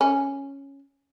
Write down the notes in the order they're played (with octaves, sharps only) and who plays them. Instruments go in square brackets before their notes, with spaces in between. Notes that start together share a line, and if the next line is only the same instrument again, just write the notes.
[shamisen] C#4